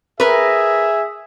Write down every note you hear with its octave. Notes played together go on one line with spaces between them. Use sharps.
G#4 A#4 B4 E5